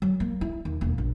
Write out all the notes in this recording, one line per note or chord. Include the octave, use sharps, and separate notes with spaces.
F#3
A#3
E4
D#2
E1 A#3
A#1